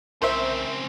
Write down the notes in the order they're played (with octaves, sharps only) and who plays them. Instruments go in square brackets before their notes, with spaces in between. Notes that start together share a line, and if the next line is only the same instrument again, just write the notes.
[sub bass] B1 [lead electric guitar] C#3 C4 [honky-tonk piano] A#4 C5 E5